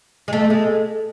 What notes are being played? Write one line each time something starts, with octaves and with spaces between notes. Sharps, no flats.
G#3
A3
G#3